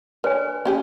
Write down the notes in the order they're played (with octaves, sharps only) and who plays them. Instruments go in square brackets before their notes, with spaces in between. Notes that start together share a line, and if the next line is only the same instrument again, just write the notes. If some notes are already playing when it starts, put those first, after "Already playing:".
[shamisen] D3 [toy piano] B4 C#5 G#5
[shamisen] C#4 G4 G#4